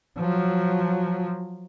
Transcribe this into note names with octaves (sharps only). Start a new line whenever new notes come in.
F3 F#3